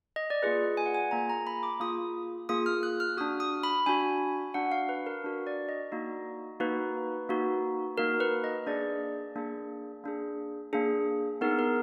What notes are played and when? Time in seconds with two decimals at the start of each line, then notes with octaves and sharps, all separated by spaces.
0.16 D#5
0.30 D5
0.43 A#3 F4 G#4 B4
0.77 G#5
0.86 F#5
0.94 G#5
1.11 A#3 F4 G#4 A#5
1.29 A#5
1.47 B5
1.63 D6
1.80 A#3 F4 G#4 D#6
2.49 A#3 F4 G#4 D#6
2.66 F6
2.83 F#6
3.00 F6
3.17 D4 F#4 D#6
3.40 D#6
3.63 B5
3.86 D4 F#4 G#5
4.54 D4 F#4 F#5
4.72 F5
4.89 B4
5.06 A#4
5.24 D4 F#4
5.47 D5
5.69 D#5
5.92 A#3 D#4 F#4
6.60 A#3 D#4 F#4 B4
7.29 A#3 D#4 F#4
7.98 A#3 D#4 F#4 A#4
8.20 B4
8.44 D#5
8.66 A#3 D4 G#4 D5
9.36 A#3 D4 G#4
10.04 A#3 D4 G#4
10.73 A#3 D4 G#4
11.41 B3 D#4 G#4 A#4
11.59 A#4